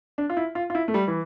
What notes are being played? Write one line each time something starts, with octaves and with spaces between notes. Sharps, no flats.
D4
F4
E4
F4
F4
E4
A3
G3
E3